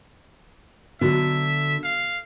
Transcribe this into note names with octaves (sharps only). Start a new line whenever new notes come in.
B2 D3 F#3 E5
F5